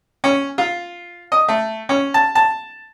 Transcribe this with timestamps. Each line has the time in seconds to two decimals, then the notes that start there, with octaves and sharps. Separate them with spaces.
0.24 C#4
0.58 F4
1.32 D#5
1.48 A3
1.89 C#4
2.14 A5
2.35 A5